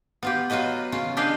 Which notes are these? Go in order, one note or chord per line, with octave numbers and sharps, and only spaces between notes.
B3 F4 G4
F#3 F4 F#4 B4 D#5
C#3 C#4 F4
D4 G4 G#4 B4 D#5 F5